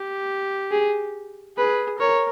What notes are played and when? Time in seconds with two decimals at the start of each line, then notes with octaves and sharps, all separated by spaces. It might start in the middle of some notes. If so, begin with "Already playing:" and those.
Already playing: G4
0.72 G#4
1.58 G#4 B4
1.99 A#4 C#5